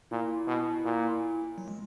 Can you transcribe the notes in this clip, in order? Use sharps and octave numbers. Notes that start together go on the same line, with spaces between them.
A#2 E4
B2
A#2
F#3
G#3